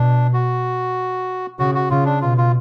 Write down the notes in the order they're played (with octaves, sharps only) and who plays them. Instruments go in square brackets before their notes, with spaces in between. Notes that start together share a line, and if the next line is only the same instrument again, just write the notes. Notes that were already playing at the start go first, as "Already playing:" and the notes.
Already playing: [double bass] B2 [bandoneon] D4
[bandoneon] F#4
[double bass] C#3 [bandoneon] F#4
[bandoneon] F#4
[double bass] C#3 [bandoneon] F4
[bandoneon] D4
[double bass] B2 [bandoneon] F4
[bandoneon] F4